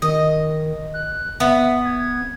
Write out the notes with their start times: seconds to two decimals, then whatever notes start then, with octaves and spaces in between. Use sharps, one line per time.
0.02 D#3 D#5
0.94 F#6
1.40 B3 E5
1.85 G#6